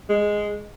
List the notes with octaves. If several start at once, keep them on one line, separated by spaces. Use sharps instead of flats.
G#3